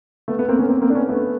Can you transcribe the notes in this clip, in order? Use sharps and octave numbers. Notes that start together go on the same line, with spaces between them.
A3 B3
A3 B3
A#3 C4
B3 C#4
A#3 C4
A#3 C4
D4
B3 C#4
A3 B3